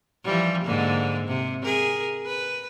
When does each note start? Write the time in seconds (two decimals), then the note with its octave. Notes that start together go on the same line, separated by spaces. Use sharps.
0.24 E3 F3 G3
0.64 G#2 D3 A#3
1.26 C3
1.62 G#4 A#4
2.25 B4